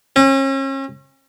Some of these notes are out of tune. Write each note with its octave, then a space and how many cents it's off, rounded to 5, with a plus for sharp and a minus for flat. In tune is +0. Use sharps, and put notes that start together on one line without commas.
C#4 -40